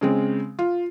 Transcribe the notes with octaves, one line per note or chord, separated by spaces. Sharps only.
C#3 G#3 C4
F4